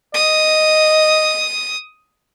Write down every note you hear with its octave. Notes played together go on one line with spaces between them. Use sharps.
D#5 D#6